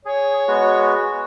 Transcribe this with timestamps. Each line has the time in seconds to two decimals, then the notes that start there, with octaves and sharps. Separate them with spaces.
0.05 G#4 C#5
0.48 G#3 B3 F#4